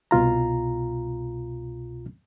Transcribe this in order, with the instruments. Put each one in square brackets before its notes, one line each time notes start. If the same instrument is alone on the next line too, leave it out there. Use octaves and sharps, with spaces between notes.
[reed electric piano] C2 B2 F4 A#5